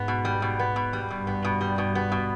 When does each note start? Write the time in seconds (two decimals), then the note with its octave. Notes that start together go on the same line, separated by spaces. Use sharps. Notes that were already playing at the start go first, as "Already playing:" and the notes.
Already playing: G#2 B3
0.08 B2
0.25 G3
0.42 B2
0.59 B3
0.76 B2
0.93 G3
1.11 G2 B2
1.27 B3
1.44 B2
1.61 G3
1.78 B2
1.95 B3
2.12 B2